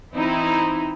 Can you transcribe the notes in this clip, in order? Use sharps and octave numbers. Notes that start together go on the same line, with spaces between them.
E3 C4 D#4 E4